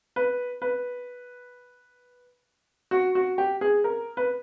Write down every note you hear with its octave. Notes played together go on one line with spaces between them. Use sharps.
B4
B4
F#4
F#4
G4
G#4
A#4
B4